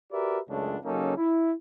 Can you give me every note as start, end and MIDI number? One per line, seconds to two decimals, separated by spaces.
0.13 0.40 66
0.13 0.40 67
0.13 0.40 70
0.13 0.40 71
0.13 0.40 74
0.13 0.40 76
0.49 0.77 37
0.49 0.77 42
0.49 0.77 49
0.49 0.77 56
0.49 0.77 57
0.49 0.77 62
0.85 1.17 49
0.85 1.17 54
0.85 1.17 58
0.85 1.17 61
0.85 1.17 63
0.85 1.17 69
1.17 1.53 64